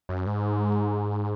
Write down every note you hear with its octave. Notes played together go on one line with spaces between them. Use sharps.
F#2
G#2